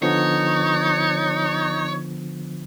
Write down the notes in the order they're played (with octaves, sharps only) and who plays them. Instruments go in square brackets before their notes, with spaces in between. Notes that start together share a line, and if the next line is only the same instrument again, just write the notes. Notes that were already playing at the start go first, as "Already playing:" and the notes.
[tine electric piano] D3 F3 B3 [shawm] D#4 [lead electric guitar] C#5